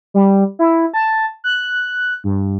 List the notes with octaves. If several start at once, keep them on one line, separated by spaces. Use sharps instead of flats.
G3
E4
A5
F#6
G2